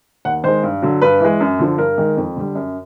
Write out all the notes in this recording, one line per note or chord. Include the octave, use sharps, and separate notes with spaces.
D#2 F#5
D#3 G#3 C5
G2
D3 F#3
G2 B4
E3 G#3
F#2
D3 F3
G2 A#4
D#3 G#3
F2
D3 G3
F#2